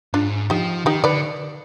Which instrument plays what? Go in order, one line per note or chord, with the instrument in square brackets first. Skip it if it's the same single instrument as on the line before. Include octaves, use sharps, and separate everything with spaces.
[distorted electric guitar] G#2 [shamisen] D4 F4
[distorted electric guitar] F3 [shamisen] D#4 G4
[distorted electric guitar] D#3 [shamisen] D#4 G4
[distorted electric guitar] D3 [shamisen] B4 D5